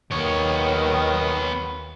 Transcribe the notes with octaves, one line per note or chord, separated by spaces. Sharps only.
D#2 D#3 B3 C#5